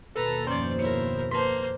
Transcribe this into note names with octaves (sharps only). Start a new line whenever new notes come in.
D#2 B2 A4 B4 A#5
F#2 F3 C#4 C5 D5
E4 A#4 C#5
A#3 B4 C5 A5 C6